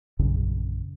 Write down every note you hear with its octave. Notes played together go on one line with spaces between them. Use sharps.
A#1 F#2 C#3